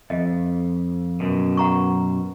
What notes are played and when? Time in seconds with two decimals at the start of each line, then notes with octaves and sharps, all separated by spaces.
0.10 F2 D#5
1.20 F#2 B2
1.57 F#5 A#5 C#6